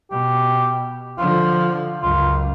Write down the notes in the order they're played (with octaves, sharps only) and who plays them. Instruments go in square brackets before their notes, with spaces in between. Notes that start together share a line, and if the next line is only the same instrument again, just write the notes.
[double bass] B2 [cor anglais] G4
[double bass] D3 F3 [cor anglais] F4
[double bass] C#2 F#2 [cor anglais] F4